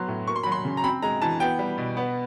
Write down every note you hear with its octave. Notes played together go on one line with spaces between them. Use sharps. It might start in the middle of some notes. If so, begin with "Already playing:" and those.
Already playing: F#3 B3 C6
A2
A#3 C#6
C6
F#3 B5
C6
C#3
A#5
C4 B5
G#3 A#5
E3 A5
B3 G5
G3
B2
B3